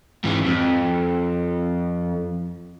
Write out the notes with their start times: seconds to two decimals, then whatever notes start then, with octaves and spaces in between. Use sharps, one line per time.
0.24 G#2 E3
0.46 F2